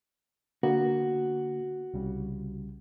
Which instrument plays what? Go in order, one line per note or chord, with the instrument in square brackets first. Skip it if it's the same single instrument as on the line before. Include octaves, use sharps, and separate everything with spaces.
[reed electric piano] D3 A#3 B3 [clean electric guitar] F#4
[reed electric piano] C2 C#3 G3